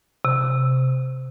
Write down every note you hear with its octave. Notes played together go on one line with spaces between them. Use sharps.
C3